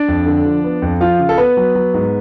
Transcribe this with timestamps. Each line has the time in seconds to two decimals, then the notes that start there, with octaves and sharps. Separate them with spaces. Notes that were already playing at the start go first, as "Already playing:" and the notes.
Already playing: D4 D5
0.08 F2
0.26 D3
0.46 F3
0.64 B3
0.82 F2
1.01 F3 F4 F5
1.19 C#3
1.29 A4
1.38 B3 B4
1.57 F#3
1.75 F#3
1.94 G#2